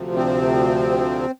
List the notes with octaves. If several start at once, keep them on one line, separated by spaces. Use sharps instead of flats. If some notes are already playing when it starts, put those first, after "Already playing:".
Already playing: D2 C3 F3
C4